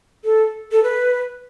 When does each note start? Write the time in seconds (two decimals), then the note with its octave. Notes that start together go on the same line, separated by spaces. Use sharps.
0.24 A4
0.72 A4
0.83 B4